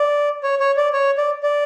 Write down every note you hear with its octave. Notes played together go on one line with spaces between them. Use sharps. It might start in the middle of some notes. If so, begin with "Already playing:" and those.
Already playing: D5
C#5
C#5
D5
C#5
D5
D5